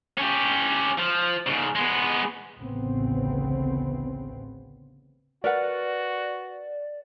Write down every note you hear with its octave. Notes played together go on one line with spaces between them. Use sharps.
C#4 G4
F3
G#2 C#3
G#3 B3
A1 D2 C#3 B3 C4
F#4 A#4 B4 D5 F#5